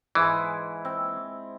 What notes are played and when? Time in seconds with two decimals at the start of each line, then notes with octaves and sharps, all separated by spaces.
0.15 G#2 E3 G#3 E4
0.85 C4